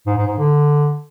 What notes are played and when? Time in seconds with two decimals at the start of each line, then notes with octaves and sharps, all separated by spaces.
0.06 G#2
0.17 G#2
0.28 G#2
0.38 D3